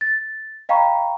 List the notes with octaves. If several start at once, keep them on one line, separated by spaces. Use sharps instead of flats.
A6
D#5 F5 G5 A#5 B5 C#6